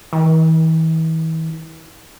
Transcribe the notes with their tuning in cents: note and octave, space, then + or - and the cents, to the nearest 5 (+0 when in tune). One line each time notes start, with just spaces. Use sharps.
E3 -40